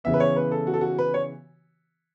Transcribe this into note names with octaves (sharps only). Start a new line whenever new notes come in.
C#3 E3 B3 E5
B4
C#5
B4
A4
F#4
A4
F#4
B4
C#5